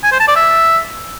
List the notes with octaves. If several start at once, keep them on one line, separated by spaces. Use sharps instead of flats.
G#5
C5
A5
D5
E5